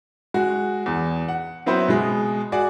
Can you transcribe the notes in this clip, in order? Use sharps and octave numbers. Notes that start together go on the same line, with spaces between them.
G#3 F#4
E2
F#5
F#3 B3 C4 E4 C5
B2 G#3
F#4 G#4 D5